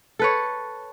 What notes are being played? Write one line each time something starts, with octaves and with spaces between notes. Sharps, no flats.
A4 B4 C#5